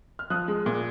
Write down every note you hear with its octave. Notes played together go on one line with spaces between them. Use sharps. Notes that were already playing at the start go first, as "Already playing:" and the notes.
F6
F3 D#6 F#6
G#3
A#2